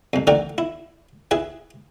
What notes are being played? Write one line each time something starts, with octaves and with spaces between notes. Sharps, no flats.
C2 F2
D3 E3 A3 A#4 D5 G5
E4
E4 G#4 B4 G#5